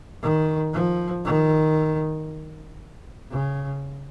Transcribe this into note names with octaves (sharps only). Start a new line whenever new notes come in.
D#3
F3
D#3
C#3